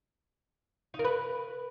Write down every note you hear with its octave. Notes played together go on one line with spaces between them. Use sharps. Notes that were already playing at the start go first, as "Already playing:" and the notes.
D#4
A#4
B4